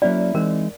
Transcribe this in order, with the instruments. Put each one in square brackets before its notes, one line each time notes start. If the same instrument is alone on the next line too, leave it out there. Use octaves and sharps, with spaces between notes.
[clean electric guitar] F#3 A#3 C#4 E4 [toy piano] D5
[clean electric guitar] E3 G#3 C4 D#4 [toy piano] A#4